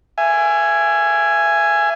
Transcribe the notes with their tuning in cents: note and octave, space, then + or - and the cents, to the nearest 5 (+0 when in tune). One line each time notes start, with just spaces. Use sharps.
E5 +30 G#5 +0